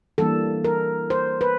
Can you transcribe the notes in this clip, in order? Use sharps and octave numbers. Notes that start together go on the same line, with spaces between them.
E3 G3 A#3 D4 A4
A#4
C5
B4